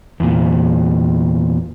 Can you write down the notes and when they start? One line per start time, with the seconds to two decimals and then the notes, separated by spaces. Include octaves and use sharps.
0.20 E2 A#2